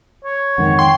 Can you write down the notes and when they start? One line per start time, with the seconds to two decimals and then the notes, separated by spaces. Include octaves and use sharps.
0.25 C#5
0.58 F2 G#2 D#3 F#5
0.79 G5 C6